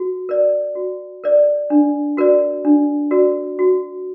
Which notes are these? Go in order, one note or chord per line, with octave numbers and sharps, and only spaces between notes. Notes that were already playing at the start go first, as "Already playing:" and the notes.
Already playing: F#4
A#4 D5
F#4
A#4 D5
D4
F#4 A#4 D5
D4
F#4 A#4 D5
F#4